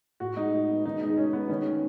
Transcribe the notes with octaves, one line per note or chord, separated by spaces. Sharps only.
A2 F#4
G#3 D#4
F#4
B3
D#3 D#4
G#3 D#4
C#4 F#4
B3 D#4
D#3 C#4
A3